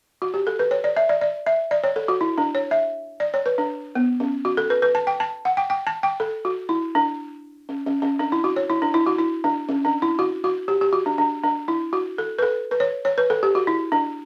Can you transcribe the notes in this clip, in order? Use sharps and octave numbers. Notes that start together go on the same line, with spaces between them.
F#4
G4
A4
B4
C#5
D5
E5
D5
D5
E5
D5
C#5
A4
F#4
E4
D4
C#5
E5
D5
C#5
B4
D4
B3
C#4
F#4
A4
B4
B4
A5
G5
A5
F#5
G5
G5
A5
G5
A4
F#4
E4
D4
C#4
C#4
C#4
D4
E4
F#4
C#5
E4
D4
E4
F#4
E4
D4
C#4
D4
E4
F#4
F#4
G4
G4
F#4
D4
D4
D4
E4
F#4
A4
B4
A4
B4
C#5
C#5
B4
A4
G4
F#4
E4
D4